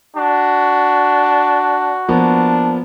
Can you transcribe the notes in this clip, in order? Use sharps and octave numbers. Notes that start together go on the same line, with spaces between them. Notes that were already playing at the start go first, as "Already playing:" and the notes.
D4 F#4
F3 A#3 B3 D4